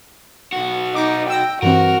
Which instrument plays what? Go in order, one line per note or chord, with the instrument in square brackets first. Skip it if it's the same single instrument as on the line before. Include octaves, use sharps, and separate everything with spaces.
[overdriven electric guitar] B1 F#4
[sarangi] D#4 [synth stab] D6
[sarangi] G5 [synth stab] E6 A#6
[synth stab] G2 E3 C4 [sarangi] F#4 [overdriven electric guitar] A#4